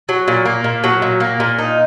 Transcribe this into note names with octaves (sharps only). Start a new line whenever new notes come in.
F#3
A#2
A#3
A#2
F#3
A#2
A#3
A#2
D#4